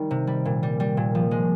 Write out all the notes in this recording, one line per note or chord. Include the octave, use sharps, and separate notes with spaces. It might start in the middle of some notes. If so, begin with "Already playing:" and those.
Already playing: D#3 G3 D#4
C3
G3
A#2
G3
G3
A#2
F3
G#3